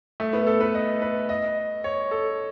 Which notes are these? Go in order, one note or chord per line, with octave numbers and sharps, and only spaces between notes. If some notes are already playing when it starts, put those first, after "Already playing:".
A3
B3
A4
B4
D#5
B4
D#5
C#5
A4